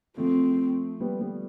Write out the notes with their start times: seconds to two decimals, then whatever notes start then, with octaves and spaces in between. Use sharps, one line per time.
0.18 F3 A3 C4
1.00 G3 B3
1.21 G3 B3